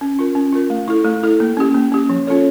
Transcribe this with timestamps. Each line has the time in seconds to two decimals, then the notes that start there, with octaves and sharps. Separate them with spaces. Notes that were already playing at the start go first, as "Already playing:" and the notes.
0.01 C#4
0.19 F4 A#4
0.35 C#4
0.53 F4 A#4
0.70 A3
0.88 E4 A4
1.05 A3
1.23 E4 A4
1.40 A#3
1.57 C#4 G4
1.74 A#3
1.92 C#4 G4
2.10 F3
2.27 C#4 F4 A4 C#5